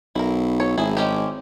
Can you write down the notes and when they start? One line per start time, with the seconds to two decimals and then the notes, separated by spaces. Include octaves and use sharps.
0.15 B1 E4 A#4
0.60 A4 C#5
0.78 G#1 E4 G#4
0.97 G#3 C#4 G4